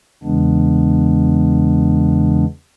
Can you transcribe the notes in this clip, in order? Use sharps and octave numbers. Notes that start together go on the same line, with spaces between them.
E2 C#3 E3 G#3 B3 D4